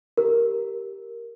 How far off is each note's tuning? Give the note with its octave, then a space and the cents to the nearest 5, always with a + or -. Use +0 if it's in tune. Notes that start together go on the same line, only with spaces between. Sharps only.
G4 -5 A#4 +0